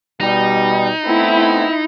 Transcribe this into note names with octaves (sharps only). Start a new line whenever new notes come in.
B2 G3 D#4
A3 B3 C4 E4